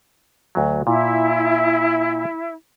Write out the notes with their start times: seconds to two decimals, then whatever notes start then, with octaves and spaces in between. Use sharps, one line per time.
0.55 D2 F#3
0.87 A#2 E4